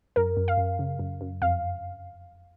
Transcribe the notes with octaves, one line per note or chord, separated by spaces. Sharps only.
F#2 A#4
F#2
F5
F#2
C#3
F#2
F#2
F2 F5